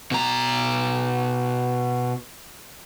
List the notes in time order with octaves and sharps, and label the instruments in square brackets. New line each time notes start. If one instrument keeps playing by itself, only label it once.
[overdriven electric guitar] B2 A#5